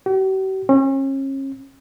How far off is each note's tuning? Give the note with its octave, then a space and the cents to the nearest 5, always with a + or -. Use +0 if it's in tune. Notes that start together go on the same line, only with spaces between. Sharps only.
G4 -45
C#4 -35